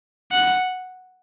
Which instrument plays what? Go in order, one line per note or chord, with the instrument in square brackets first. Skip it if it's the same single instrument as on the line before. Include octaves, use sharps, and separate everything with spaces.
[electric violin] F#5